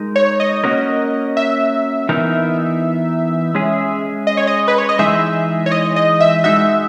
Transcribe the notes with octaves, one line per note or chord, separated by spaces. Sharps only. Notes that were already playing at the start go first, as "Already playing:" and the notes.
Already playing: G#3 D#4 A#4
C#5
D#5
A#3 C#4 F#4 A#4
E5
E3 B3 D#4 A#4
G#3 C#4 G#4
D#5
C#5
D#5
B4
C#5
D#5
E3 G#3 D#4 G#4 E5
C#5
D#5
D#5
E5
G#3 D#4 F#4 E5